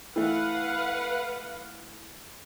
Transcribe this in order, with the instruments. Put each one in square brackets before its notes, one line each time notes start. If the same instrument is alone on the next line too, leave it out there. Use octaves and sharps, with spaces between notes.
[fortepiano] E3 A3 [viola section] B4 F5 F#5